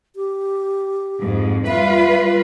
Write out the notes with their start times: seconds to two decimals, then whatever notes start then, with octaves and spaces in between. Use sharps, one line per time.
0.16 G4
1.20 F2 G#2
1.67 G3 F4 B4 E5